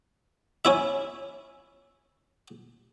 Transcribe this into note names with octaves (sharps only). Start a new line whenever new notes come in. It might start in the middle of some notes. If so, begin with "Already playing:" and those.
C#4 E4 E5